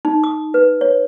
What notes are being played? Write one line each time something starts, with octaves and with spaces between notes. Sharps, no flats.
D#4
D#6
B4
C#5